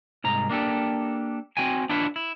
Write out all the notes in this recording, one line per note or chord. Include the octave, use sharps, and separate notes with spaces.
C2 G#2 A#5
A#3 D4 G4 A4
C4 F#4 G5 G#5
D4 E4 F4 B4 C#5
E4